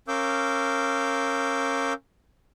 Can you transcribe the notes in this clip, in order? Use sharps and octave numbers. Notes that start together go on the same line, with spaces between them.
C#4 A#4 F5 D6 E6 G6